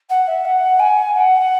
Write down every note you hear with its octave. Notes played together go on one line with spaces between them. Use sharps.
F#5
E5
F#5
G#5
F#5